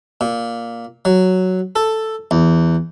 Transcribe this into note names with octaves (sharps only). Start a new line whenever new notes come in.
A#2
F#3
A4
E2